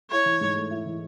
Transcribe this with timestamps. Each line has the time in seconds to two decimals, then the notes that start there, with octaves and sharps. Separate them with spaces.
0.10 E4 C#5
0.26 E3
0.41 G#2
0.56 A3
0.71 E4
0.86 E3